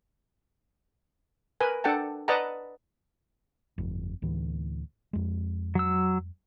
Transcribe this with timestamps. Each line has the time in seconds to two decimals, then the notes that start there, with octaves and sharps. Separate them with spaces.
1.60 A#4 B4 G#5
1.84 D4 A4 F#5 G5 A5
2.28 B4 D5 D#5 F#5 A5 A#5
3.78 G1 F2
4.22 D2 A2 E3
5.13 F2 G#3
5.75 F#3 E6